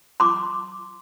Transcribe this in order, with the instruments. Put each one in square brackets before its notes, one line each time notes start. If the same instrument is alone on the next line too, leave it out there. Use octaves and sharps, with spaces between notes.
[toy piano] C6 D6